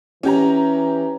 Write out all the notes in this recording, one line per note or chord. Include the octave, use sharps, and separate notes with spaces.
E3 C#4 G4 A#5